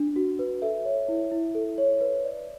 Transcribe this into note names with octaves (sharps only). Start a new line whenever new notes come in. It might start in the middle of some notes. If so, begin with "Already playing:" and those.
Already playing: D4
F#4
B4
A4 E5
C#5
E4
E4
A4
C#5
B4
D5